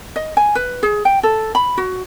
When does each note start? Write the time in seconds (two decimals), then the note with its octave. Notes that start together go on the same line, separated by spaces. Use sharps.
0.16 D#5
0.37 G#5
0.55 B4
0.83 G#4
1.05 G5
1.23 A4
1.55 B5
1.77 F#4